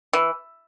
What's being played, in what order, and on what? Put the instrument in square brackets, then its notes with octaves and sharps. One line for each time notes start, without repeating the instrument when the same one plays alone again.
[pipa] E3